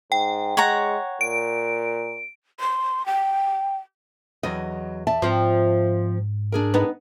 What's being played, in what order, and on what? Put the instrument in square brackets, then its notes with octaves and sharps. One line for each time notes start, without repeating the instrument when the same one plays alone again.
[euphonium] G#2 [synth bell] G5
[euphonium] G#3 [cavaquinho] C#5 F#5 A#5
[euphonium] A#2 [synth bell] D7
[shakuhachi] C6
G5
[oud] E2 [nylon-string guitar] F#3 D#5
[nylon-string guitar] D5 E5 A5
[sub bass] G#2 [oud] F3 C4
[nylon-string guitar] D4 G#4 A#4
[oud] B3 D#4